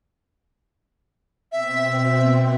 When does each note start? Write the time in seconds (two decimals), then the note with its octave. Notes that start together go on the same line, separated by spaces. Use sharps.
1.52 B2 C4 E5